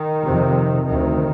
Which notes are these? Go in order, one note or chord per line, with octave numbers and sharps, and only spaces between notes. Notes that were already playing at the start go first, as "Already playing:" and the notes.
Already playing: D#3
F2 C3
D2 C3 D#3